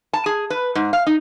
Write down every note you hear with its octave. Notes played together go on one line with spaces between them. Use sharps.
A5
G#4
B4
G#2
F5
D#4